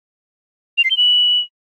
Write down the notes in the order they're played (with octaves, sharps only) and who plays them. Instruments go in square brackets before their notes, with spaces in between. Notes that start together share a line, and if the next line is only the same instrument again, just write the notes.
[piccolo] F7
C7
G7
F#7